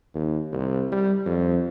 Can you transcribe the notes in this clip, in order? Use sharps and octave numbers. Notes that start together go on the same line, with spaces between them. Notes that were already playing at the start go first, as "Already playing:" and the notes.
D#2
C2
G3
F2